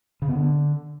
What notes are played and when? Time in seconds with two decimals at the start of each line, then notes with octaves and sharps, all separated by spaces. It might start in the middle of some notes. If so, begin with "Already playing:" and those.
0.22 C#3
0.29 B3
0.35 D3